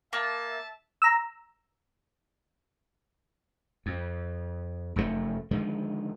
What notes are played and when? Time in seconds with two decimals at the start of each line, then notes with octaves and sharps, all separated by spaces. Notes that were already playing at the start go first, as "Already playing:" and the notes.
0.13 A#3 E5 A5
1.02 A#5 E6
3.86 F2
4.96 F1 F#2 A#2 A3
5.51 D3 D#3 F3 G#3